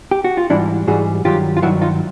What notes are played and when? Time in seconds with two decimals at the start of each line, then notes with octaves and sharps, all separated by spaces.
0.11 G4
0.24 F#4
0.37 F4
0.50 G#2 E3 G3 D4 E4
0.87 G#2 E3 G3 F#4 G#4
1.25 G2 D#3 F#3 F4 G4
1.57 F4
1.62 G2 D#3 F#3 E4 F#4
1.81 D#4 F4